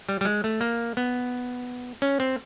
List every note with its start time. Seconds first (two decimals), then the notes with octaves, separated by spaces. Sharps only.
0.09 G3
0.21 G3
0.25 G#3
0.44 A3
0.61 A#3
0.97 B3
2.02 C#4
2.20 C4